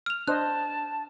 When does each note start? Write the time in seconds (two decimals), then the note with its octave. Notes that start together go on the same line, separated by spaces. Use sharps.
0.06 F6 F7
0.27 D4 C5 D#5 A5 F#6